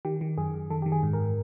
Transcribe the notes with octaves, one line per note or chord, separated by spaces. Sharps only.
D#3 G4
D#3
F#2 G#4
F#2
D#3 A4
D#3 G4
G#4
G#2
A#4